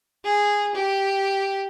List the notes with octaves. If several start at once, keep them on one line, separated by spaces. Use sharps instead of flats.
G#4
G4